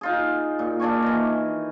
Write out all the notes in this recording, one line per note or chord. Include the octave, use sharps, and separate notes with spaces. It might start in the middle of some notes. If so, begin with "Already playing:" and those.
D#4 F4 G#4
A#2
A#2 D4 G#5 C#6
D#3 E3